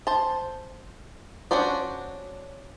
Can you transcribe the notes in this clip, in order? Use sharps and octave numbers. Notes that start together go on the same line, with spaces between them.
C5 A5
C#4 D4 F#4 C5 D5